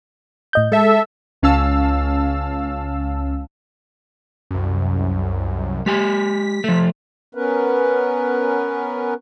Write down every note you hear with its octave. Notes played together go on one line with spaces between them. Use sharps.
A2 D#5 G6
G#3 A4 E5
C#2 C#4 F5 A5 E6
C2 F#2
G#3 G4 G#5 B6
F3 A3
B3 C#4 A#4 B4